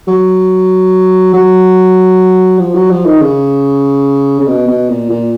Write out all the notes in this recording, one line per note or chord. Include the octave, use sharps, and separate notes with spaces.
F#3
F#3
F3
F#3
F3
D#3
C#3
C#3
B2
B2
A#2
A#2